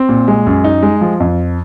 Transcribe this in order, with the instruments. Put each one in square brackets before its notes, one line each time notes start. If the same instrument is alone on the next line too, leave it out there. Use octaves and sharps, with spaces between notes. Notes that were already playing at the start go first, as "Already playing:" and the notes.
Already playing: [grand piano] C4
A#2
G#3
F#2
D#4
G#3
F3
F2